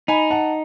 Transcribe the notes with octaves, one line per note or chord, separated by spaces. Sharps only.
D#4 G#5 B5
F#5 A5